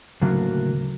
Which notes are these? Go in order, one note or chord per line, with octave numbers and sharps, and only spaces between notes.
D2 A2 C#3 F#3 A#3